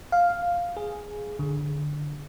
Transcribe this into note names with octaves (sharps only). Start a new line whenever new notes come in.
F5
G#4
D3